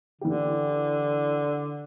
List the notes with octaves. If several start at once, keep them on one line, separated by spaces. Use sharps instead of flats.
D3 E3 G4